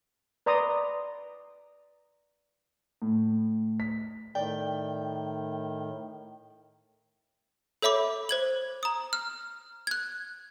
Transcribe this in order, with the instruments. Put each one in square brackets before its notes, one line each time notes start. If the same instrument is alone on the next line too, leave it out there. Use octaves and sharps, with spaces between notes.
[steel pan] B4 D5 A#5 C6 D#6
[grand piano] A2
B6
[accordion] A2 D#3 [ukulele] D5 [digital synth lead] G5
[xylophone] A4 C#5 E5 B5 D6
C5 G#6 F#7
A#5 D#6
F6
F#6 G#6